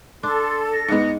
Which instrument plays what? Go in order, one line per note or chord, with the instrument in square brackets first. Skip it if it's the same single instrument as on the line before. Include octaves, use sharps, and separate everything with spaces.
[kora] D4 [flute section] A4 [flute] C6
[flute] A#6
[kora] G#2 G#3 [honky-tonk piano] B3 D#4 C#7